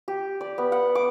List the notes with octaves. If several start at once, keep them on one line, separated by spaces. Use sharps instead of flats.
G4
D5
B3
F#5
D6